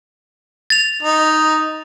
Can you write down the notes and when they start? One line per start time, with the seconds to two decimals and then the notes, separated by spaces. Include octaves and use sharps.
0.70 A6 F7
1.02 D#4